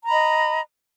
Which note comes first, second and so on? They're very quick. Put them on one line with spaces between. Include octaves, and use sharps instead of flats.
A#5 B5 D#5